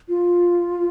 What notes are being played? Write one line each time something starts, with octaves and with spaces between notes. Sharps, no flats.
F4